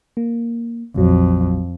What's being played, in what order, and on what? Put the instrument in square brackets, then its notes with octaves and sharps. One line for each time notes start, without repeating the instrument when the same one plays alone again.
[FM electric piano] A#3
[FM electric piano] A#1 F#3 [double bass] F2